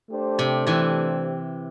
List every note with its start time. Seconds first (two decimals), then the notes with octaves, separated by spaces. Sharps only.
0.10 A3 D4 G4 C5
0.39 C3
0.67 C3 E3